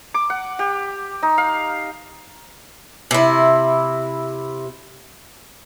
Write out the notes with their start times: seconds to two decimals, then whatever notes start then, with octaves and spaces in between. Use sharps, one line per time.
0.14 D6
0.30 F#5
0.59 G4
1.23 D#4
1.38 F5
3.11 C3 E4